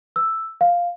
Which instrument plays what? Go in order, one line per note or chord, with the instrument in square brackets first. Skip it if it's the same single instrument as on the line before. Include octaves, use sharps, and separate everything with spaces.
[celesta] E6
F5